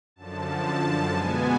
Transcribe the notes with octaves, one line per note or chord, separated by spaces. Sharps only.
F#2 D3 F3 A5
A5
B2 G#3 B3 G#5